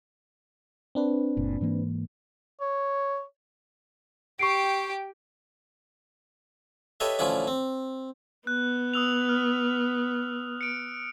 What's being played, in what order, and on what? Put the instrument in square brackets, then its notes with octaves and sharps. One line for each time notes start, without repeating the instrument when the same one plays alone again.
[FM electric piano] C4 D4 B4
[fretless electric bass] F#1 A#2
G#2 E3 A#3
[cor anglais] C#5
[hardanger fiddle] G4 G5 [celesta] C#6 C7 D7
[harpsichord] G4 A4 B4 C#5 D#5 E5
A1 D3 F3 C#4 E4 D5
C4
[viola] B3 [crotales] F#6
[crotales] D#6 E6 F7
F6
C#7 D7